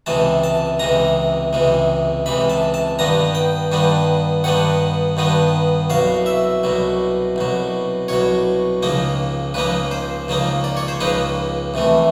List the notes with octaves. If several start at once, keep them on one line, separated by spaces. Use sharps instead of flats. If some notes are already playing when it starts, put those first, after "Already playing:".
C#2 C3 E3 G#3 A5
A5
C#2 C3 E3 G#3 A#5
C#2 C3 E3 G#3
C#2 C3 E3 G#3 B5
A5
A5
G2 D#3 G3 B3 D4 A#5
G5
G2 D#3 G3 B3 D4
G2 D#3 G3 B3 D4 F#5
G2 D#3 G3 B3 D4
C2 B2 F#3 F5
E5
C2 B2 F#3
C2 B2 F#3
C2 B2 F#3 C#5
C#2 C#3 F3 A#3 D#4
C#2 C#3 F3 A#3 D#4 B4
C5
C#2 C#3 F3 A#3 D#4
D5
C#5
C5
C#2 C#3 F3 A#3 D#4 B4
C2 C3 E3 A3